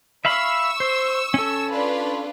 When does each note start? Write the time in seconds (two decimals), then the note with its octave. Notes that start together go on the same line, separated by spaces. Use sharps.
0.25 E5 F5 B5 C#6 E6
0.80 C5
1.34 C#4 A4
1.72 D4 F4 B4